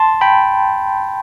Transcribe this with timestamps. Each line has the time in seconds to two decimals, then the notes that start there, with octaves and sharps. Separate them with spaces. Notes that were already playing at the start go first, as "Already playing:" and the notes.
Already playing: A5 C6
0.21 G5 B5